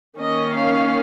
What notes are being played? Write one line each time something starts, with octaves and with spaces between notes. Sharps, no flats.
D#3 A#3 C#4 D#5
F5